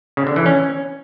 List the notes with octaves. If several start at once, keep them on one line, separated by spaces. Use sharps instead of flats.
C#3
D3
E3
C#4